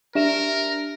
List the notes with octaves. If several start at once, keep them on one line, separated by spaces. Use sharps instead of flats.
D4 G4 A#4 E5 E7